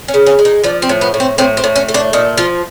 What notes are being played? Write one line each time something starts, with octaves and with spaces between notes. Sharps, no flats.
C#4
C#3
C#4
G#3
D#4
F3 D4
C4
A2
B3
A2
C4
A2 C4
C4
A2
C#4
A3
D4
A#2 D#4
F3 F4